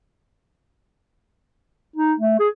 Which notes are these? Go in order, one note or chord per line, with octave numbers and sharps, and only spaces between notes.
D#4
A3
G#4